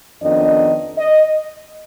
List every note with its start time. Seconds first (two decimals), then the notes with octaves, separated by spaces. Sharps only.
0.22 F2 D#3 B3 D4 D#5
0.97 D#5